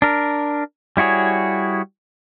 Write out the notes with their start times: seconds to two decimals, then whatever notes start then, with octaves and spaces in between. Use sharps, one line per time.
0.02 D4 A#4
0.97 G3 E4 F#4 G#4 C#5